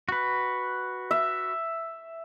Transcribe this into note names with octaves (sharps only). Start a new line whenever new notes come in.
F#4 B4
E5